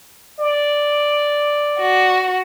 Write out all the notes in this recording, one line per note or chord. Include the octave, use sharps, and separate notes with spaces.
D5
F#4